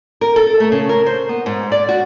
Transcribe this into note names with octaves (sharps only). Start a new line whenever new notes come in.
A#4
A4
A3
C#3
A#4
C5
B3
G#2
D5
F#4